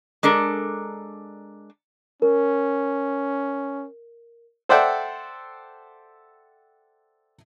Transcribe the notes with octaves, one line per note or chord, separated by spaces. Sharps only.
G#3 D4 A4 A#4
C#4 A#4
A4 C5 D5 E5 F#5 G5